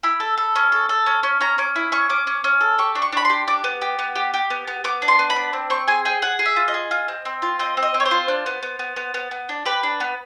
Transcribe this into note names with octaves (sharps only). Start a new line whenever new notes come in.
E4 B5
A4
A4
C#4
A4
A4
C#4
C#4
C#4 A#5
C#4 D6
E4
C#4 C#6
C#4 D6
C#4
C#4
A4
G4 C#6
D4
C#6
D4 B5
G4 C6
D4 D6
B3
G4
B3
G4
G4
B3
B3
B3 D6
D4
C6
B3
B5
D4
C4
C4 C#6
G#4 G#5
G#4 G5
G#4 F#5
G#4
E5
F4
D#5
G#4
F4
C4
C4
F4
C4 D#5
C4
D#5
C4
C#5
C5
F4
D4
B3
B3
B3
B3
B3
B3
D4
G4 B4
D4
B3